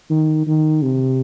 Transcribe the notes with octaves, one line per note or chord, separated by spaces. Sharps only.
D#3
D#3
C3